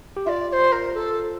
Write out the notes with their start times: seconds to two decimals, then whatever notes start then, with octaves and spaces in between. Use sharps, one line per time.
0.17 G4
0.26 F4 D5 E5
0.49 D5
0.53 C5
0.72 A#4
0.95 A4